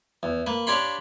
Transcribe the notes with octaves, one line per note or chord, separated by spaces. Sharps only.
E2
A#3 B4
D4 G4 C#5 F5 B5 C6